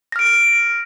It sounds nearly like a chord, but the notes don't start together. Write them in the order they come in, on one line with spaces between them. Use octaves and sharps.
A#6 F6 D7